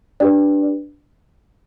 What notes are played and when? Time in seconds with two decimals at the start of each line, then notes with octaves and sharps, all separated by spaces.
0.20 D4 G4 B4 D5